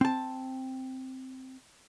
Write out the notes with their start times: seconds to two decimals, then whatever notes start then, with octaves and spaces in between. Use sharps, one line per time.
0.01 C4 A5